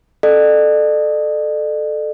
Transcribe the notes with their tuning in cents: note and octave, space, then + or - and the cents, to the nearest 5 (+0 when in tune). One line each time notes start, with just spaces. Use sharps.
A4 -5 D5 +45